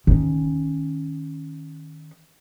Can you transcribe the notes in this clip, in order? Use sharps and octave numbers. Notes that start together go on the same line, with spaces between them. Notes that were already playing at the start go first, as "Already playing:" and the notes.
D#3 C#4